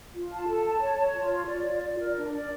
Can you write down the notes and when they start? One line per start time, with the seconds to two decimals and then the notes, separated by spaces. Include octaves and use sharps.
0.14 F4
0.32 A5
0.48 A4
0.65 A5
0.81 C#5
0.98 C#5
1.15 F4
1.32 C#5
1.49 D5
1.66 F4
1.83 D5
2.00 A#4
2.17 D4
2.33 D5